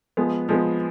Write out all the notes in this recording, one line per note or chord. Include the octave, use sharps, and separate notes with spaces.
F3 G#3 B3
F3 G#3 B3